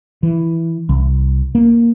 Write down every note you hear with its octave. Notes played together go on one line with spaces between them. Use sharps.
E3
C2
A#3